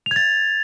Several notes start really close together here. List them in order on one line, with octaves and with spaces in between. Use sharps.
F7 G#6 A6